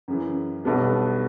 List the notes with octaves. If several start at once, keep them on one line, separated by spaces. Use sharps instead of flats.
F#2 C#3 E3
B1 B2 G3 B3 D4